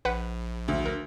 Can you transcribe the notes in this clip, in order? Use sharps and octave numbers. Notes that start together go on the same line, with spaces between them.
A#1 B4 F#5
D2
A#4